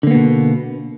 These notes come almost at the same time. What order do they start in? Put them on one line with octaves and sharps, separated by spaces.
D3 A#3 B3 B2